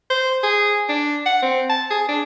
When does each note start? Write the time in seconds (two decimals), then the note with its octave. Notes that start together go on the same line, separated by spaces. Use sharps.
0.10 C5
0.43 G#4
0.89 D4
1.26 F#5
1.42 C4
1.69 A5
1.90 G#4
2.08 D4